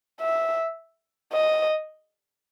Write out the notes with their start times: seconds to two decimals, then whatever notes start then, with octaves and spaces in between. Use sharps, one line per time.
0.21 E5
1.32 D#5